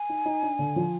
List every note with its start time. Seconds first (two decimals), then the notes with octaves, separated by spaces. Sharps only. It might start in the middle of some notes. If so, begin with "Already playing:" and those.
Already playing: G#5
0.09 D#4
0.26 D#4
0.42 D4
0.59 D3
0.76 F3